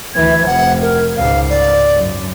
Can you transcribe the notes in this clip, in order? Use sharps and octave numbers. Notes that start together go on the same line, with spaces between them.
D2 E3 G#6
F1 F3 F#5
A#4
C#2 G#2 F5
D5
F#2